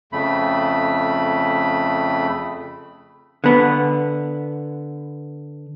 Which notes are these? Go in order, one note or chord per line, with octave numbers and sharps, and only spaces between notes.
F2 C#3 A3 B5
D3 B3